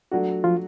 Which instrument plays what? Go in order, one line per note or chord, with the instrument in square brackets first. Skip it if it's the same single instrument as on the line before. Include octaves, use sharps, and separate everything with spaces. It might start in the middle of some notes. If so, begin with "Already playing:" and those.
[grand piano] F#3 A3 D4 F#4
[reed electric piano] F3 F4